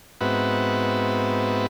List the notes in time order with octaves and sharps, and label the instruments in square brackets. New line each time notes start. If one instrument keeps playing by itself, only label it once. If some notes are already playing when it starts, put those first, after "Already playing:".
[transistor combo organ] G#2 B3 C4 F#4 B4 E5